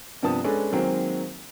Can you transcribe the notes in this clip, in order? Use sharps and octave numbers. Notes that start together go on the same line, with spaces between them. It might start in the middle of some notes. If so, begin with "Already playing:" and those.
G2 C3 F3 B3 A5 D#6
G#3 C#4 D4 A4 B4
D#3 F#3 G#3 A#3 C4